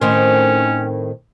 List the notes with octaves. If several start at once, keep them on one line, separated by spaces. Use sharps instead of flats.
A2 D#3 C4 C#4